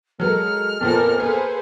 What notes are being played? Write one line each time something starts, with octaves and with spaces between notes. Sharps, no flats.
F#3 G#3 A4 A#4 F6
F2 A#2 F3 B3 A4 A#4
A#3 G#4 A4 B4 C5